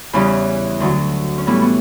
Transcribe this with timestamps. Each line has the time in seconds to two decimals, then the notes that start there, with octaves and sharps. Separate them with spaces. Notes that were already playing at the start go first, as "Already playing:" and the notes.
0.13 E2 C#3 E3 G3 C#4
0.80 D2 D3 F#3
1.38 C#4
1.47 A2 E3 G3 B3
1.62 B3